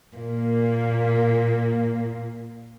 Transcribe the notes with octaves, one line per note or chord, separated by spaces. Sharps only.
A#2 A#3